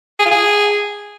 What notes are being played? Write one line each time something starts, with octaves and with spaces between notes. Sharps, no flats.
G#4
F4
G#4